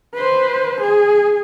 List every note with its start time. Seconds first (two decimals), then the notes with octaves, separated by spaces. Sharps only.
0.14 B4 C5
0.80 G#4